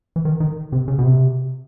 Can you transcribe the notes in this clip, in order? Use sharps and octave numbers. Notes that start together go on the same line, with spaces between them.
E3
D#3
D#3
C3
C#3
B2
C3